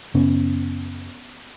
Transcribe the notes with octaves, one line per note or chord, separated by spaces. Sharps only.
F#2 C#3 B3 C#4